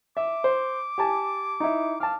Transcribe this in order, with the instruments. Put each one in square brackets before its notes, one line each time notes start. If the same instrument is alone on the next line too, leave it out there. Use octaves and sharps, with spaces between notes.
[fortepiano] E5 [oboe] D6
[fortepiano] C5
G4 G#5 A5
D#4 E4
[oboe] F5 [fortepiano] A5 D6